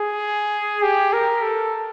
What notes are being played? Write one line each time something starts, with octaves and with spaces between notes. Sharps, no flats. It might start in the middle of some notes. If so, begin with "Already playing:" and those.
Already playing: G#4
G4
A#4
A4